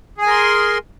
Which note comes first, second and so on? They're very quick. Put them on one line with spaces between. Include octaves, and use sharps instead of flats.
G#4 G#5 A#4 C6